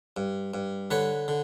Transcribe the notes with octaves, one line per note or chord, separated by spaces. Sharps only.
G2
G2
D3 B4 C#5
D3